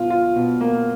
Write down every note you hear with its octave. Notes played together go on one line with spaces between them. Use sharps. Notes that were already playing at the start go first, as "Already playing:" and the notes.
Already playing: B2 F4
F4
B2
A#3